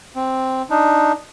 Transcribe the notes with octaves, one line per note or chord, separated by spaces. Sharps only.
C4
D4 D#4